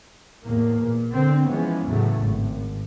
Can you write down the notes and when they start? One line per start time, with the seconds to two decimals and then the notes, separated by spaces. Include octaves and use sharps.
0.43 E2 A2 A#3
0.81 A#2
1.12 D3 C4
1.46 E3 F3 G#3 B3 C#4
1.88 E2 A2 C#3 F#3 A3
2.21 G#1